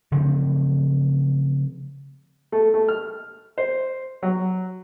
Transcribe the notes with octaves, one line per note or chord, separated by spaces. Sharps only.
C#3 F3 A3 C4
A3
A3
F6
C5
F#3